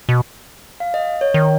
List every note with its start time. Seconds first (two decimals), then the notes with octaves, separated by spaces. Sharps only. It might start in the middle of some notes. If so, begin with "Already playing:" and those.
0.09 B2
0.80 F5
0.94 D#5
1.21 C#5
1.34 D#3